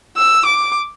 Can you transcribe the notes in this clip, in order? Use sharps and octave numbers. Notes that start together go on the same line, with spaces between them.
E6
D6